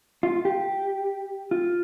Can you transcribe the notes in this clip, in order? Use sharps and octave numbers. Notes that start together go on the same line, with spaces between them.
F4
G4
F4